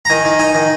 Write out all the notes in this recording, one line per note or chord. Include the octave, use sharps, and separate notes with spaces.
A#5
D#3 G#5
D#3
D#4 G#5
D#3